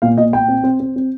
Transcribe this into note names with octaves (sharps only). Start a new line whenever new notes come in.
A#2 F5
A#2 D#5
A#2 G5
C4
C4
C4
C4